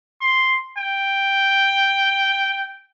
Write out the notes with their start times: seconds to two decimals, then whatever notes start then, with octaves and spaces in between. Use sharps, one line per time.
0.21 C6
0.78 G5